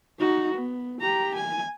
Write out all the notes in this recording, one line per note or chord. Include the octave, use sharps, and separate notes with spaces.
D#4 F#4
B3
G4 A#5
G#5